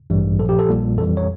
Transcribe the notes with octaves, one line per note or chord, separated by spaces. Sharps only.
A1 G2 E3 G3
A#1 A#2 F3 A4
G4
A4
A#1 A#2 G3
F2 E3 G3 A4
C#5